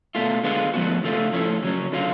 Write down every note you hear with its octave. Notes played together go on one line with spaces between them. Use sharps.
B2 A3 F4
D3 G#3 B3 F4
A2 F3 G#3 B3 F#4
C#3 F3 A3 F4
A2 F3 A3 C#4
C#3 F#3 C#4
D3 F#3 C#4 F4